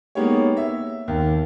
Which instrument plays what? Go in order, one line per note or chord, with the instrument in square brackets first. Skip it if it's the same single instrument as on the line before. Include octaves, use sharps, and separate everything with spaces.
[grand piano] G#3 A#3 B3 D#4 G4 C#5
E5
D#2